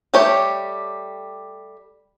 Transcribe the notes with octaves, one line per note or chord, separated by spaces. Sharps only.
G3 A3 G4 C#5